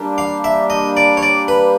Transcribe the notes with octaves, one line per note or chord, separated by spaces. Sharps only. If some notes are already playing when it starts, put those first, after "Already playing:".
Already playing: G3 A#3 D4 G4
F5
E5
D#5
D5
C#5
D5
B4